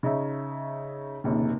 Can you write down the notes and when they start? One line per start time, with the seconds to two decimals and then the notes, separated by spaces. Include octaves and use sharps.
0.03 C#3 D#4 C#5 E5
1.24 F1 A#1 D#2 C#3